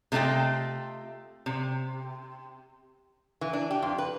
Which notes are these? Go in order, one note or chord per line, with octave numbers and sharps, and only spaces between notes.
C3 A3 F4 D#5 G5
C3
E3
D4
G4
F2
B4